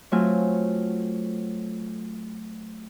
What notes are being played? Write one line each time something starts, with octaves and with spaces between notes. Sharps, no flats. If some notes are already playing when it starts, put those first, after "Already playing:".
F#3 A3 C4 F4 C#5 G#5